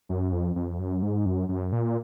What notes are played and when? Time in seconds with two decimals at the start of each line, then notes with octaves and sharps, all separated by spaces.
0.09 F#2
0.32 F2
0.56 F2
0.79 F#2
1.02 G#2
1.26 F#2
1.49 F#2
1.72 A#2